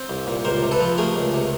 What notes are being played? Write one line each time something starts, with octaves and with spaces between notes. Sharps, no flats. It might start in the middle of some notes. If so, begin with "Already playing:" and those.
Already playing: C4
C2
A#2
C#2 A#4 C5
C3
A4 B4
F3
A3 G#4 A#4
C#2
C3